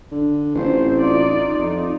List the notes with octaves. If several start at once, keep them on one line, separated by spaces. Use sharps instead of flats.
D3
A1 C4 F4 C5
D#4 F4 D5
F2 D#4